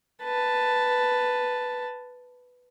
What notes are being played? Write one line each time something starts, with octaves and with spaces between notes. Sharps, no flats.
B4 A5